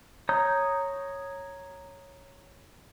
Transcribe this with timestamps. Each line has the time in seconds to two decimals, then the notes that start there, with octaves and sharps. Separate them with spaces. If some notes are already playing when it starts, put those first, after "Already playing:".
0.29 C#5 A#5 D#6 G6